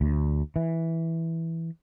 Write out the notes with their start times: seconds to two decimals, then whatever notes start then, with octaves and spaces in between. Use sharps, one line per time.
0.01 D2
0.56 E3